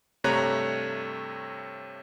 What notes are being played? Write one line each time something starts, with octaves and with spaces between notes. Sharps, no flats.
G2 C3 A3 C#5 A#5 F#6